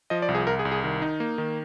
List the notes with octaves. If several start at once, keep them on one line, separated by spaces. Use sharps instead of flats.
F3 D#5
D5
C2
G#4
C2 A#4
G#4
C2
G#4
D#3
D#4
A#3
D#3